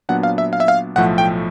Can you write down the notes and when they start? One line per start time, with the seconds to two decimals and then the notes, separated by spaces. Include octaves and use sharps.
0.09 A#2 F#3 B3 D4 F#5
0.23 F5
0.38 E5
0.53 F5
0.60 E5
0.68 F5
0.96 B1 A2 F3 A3 F#5
1.18 G5